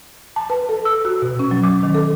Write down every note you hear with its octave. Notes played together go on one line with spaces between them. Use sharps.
A5
B4
A4
E6
F#4
B2
C#4
F#3
D6
D#3
A4